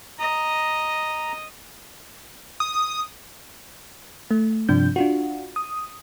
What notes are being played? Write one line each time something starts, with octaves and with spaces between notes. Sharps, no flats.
D#5 A#5
D#6
A3
G2 C3 F3 D4 G6
D4 F4 F#4
D#6